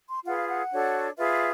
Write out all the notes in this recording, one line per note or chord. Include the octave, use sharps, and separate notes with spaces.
C6
F4 G#4 B4 F#5
F5
F#5
D4 F#4 A4 C#5
F4 G#4 B4 E5